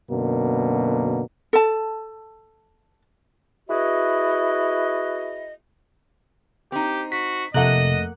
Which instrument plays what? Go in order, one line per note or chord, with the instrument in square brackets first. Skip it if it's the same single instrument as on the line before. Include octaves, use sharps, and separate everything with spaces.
[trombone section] F#2 B2 D3 A#3
[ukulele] A4 A5
[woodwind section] E4 F#4 G#4 B4 D#5
[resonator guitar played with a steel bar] C4 D#4 [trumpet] G4
[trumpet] F#4 [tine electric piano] B6
[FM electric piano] F2 A3 F#6 [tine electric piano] C3 [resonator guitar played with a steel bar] A#3 F#5 [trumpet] D#5